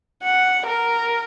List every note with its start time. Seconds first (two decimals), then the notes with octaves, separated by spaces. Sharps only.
0.23 F#5
0.66 A#4